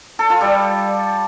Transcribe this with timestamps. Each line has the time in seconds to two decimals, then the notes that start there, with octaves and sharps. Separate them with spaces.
0.19 A4
0.30 F4
0.41 G3